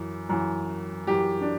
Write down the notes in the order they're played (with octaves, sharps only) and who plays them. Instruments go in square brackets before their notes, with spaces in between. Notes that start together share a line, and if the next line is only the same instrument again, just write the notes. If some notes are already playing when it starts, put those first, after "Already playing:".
Already playing: [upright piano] F#2 E3
F#2 E3
F#2 E3 G4
D4